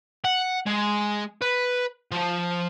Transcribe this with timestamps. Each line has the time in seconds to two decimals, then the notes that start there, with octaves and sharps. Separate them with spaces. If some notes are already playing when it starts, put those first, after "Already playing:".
0.24 F#5
0.66 G#3
1.42 B4
2.12 F3